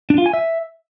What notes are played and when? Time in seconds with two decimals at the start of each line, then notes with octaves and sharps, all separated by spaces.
0.10 D4
0.18 F4
0.26 G#5
0.34 E5